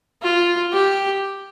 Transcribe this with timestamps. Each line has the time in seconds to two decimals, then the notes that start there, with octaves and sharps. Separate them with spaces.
0.23 F4
0.73 G4